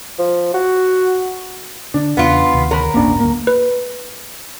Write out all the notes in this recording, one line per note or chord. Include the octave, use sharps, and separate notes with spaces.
F3
F#4
D3 D4
E2 C#3 B3 F4
D2 C3 D#3
A#4 C#5 B5
D1 G1 A#3 C#4 D4
D2 G2 A#3
B4